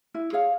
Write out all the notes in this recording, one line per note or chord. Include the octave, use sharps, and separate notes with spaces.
E4
G#4 C#5 F5